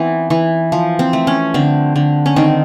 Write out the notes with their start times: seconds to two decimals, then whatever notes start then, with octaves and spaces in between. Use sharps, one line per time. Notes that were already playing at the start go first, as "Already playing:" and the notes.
Already playing: E3 B3 C4
0.30 E3
0.72 F3
0.99 C4
1.13 A3
1.27 C#4
1.54 D3 C4
1.96 D3
2.26 C#4
2.36 D#3 C4